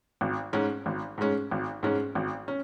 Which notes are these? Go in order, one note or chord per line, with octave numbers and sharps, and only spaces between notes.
G#1
G#2 G#3 C#4
G#1
G#2 G#3 C#4
G#1
G#2 G#3 C#4
G#1
C#4